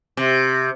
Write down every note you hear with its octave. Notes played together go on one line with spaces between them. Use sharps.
C3